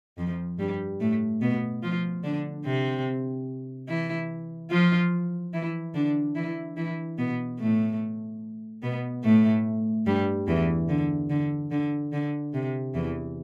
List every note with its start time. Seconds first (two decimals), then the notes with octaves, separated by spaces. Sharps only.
0.18 F2 F3
0.59 G2 G3
1.00 A2 A3
1.42 B2 B3
1.83 F3 F4
2.24 D3 D4
2.65 C3 C4
3.89 E3 E4
4.71 F3 F4
5.53 E3 E4
5.95 D3 D4
6.35 E3 E4
6.77 E3 E4
7.18 B2 B3
7.59 A2 A3
8.83 B2 B3
9.24 A2 A3
10.06 G2 G3
10.48 E2 E3
10.89 D3
11.30 D3
11.71 D3
12.13 D3
12.54 C3
12.94 E2 E3